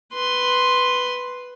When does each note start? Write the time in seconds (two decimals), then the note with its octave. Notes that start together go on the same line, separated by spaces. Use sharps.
0.14 B4 C6